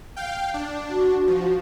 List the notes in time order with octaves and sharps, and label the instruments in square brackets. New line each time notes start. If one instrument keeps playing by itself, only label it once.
[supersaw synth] F5 G5
D4
[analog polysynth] F#4
[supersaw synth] F3